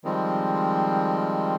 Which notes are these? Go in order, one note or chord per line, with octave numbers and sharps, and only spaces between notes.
D#3 F3 G3 G#3 C4